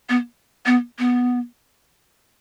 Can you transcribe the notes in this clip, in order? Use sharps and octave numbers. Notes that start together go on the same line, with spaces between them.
B3
B3
B3